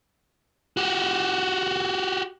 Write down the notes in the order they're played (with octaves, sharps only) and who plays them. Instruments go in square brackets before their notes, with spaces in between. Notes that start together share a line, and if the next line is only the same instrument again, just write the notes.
[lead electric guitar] F#4 G4